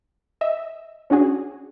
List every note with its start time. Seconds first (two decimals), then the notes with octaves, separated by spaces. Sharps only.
0.41 D#5 E5
1.10 C#4 D4 F#4 G#4